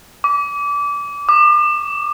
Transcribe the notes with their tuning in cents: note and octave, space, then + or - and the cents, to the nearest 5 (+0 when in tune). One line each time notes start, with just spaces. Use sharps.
D6 -25
D6 +40